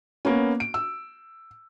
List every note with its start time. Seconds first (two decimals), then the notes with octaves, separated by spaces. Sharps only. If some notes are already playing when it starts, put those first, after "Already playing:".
0.25 A#3 B3 C#4
0.60 D7
0.74 E6